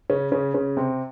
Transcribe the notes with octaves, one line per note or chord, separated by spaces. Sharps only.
C#3 C#4
C#3 C#4
C#3 C#4
C3 C4